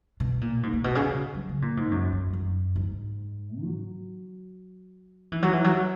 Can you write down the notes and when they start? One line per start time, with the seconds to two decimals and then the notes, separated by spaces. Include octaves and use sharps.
0.20 B2
0.41 A#2
0.63 G#2
0.73 A#2
0.84 B2
0.95 C#3
1.06 C#3
1.35 F#3
1.49 C#3
1.62 A#2
1.77 G#2
1.91 F#2
2.12 F#2
2.33 F#2
2.76 G#2
3.62 F#3
5.32 E3
5.42 F#3
5.53 E3
5.64 F#3